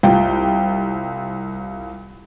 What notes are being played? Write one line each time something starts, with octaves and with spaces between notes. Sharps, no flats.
C2 F4 G5